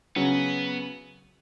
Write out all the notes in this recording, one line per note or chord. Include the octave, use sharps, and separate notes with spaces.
C#3 F#3 B3 C#4 F#4